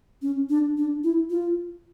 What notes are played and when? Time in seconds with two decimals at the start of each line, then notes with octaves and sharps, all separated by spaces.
0.22 C#4
0.49 D4
0.77 D4
1.04 E4
1.30 F4